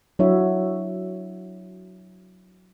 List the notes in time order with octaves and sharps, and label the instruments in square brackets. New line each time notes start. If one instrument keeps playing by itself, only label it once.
[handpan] F#3 D4 E4 F#4 C#5 E5